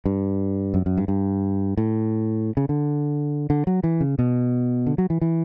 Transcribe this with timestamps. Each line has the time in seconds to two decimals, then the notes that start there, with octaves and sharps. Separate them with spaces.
0.06 G2
0.74 F#2
0.86 F#2
0.97 G2
1.08 G2
1.77 A2
2.57 C#3
2.69 D3
3.50 D3
3.67 F#3
3.84 E3
4.01 C#3
4.19 B2
4.87 D3
4.98 F#3
5.10 E3
5.21 E3